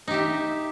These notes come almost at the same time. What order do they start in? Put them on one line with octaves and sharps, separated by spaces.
D#4 G4 E5